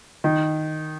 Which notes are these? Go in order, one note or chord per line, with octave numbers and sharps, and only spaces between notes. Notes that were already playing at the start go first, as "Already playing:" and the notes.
D#3